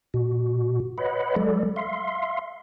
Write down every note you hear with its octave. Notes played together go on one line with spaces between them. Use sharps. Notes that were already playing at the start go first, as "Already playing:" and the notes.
A#2 F#4
B4 C#5 D#5 F#5 B5
F#3 G#3 A4 D5
E5 F5 C6